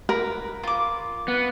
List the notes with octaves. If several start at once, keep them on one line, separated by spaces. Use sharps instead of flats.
A#4 B4
F4 D6
B3